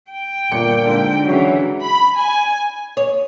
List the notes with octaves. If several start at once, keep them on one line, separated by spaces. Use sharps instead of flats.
G5
G1 A#2 C#7
G#2 D3
C#3 E3 F#3
B5
G#5
C#5